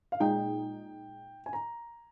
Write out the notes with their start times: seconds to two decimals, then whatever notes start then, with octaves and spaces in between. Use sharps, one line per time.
0.12 F5
0.20 A#2 G#3 D#4 G#4 G5
1.46 G#5
1.53 A#5